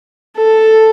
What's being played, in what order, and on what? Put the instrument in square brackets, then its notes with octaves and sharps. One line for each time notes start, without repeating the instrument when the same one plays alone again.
[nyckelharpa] A4